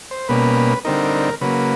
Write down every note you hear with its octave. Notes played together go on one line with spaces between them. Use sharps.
C5
B2 G3 A#3 C#4 B4
D3 G3 C4 D#4 A#4
C#3 F#3 A#3 B4